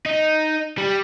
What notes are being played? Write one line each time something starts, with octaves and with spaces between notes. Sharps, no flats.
D#4
G3